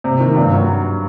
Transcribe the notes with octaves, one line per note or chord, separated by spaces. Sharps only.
C3
D#3
G2
F#3